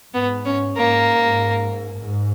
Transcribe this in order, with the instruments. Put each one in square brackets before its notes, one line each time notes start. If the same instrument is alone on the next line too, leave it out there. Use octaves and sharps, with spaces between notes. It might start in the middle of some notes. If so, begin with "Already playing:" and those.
[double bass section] G#2 [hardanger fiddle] B3
[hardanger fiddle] C#4
[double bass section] G#2 [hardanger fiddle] A#3
[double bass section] G#2